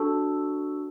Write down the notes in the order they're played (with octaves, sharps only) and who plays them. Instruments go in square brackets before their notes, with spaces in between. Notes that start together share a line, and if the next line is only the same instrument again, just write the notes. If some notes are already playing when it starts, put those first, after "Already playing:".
Already playing: [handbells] D4 F#4 A4